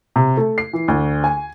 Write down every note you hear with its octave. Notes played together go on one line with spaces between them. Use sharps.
C3
A3
C7
E3
D2
G#5